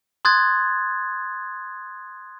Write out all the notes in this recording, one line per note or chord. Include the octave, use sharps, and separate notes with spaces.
C6 D#6 F#6 G#6 A6